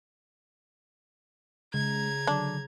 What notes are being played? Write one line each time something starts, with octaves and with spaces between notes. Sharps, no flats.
C#3 G#3 A#5 G#6
D3 F#3 D4